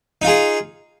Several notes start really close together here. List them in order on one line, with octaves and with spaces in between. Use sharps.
D#4 F4 G#4